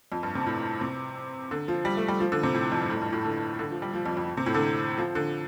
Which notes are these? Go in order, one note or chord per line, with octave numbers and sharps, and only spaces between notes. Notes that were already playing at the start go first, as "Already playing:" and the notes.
F2
G2
C3
A2
C3
D3
F3
G3
A3
G3
F3
D3
C3
A2
F2
G2
A2
F2
G2
A2
D3
D3
F3
G3
F3
F2
F2
C3
A2
D3
F3
D3